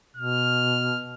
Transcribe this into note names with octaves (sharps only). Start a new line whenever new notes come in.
B2 F6